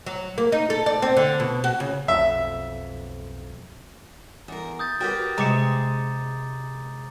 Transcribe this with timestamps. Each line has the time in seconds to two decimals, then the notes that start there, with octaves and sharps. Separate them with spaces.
0.06 F#3
0.38 A#3
0.52 D#4
0.70 A4
0.86 D5
1.02 C4
1.17 D3
1.40 B2
1.64 F#4
1.80 C#3
2.08 B1 F2 E5
4.48 E2 A#4
4.79 D#6 G6 A6
5.00 F#4 G4 A#4 B4 G5 A6
5.38 C3 G#3 A#5 D6 C#7 E7